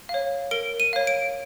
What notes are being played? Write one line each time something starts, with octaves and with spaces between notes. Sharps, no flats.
F5
C#5
A#4 D7
D#7
C#5 F5
D7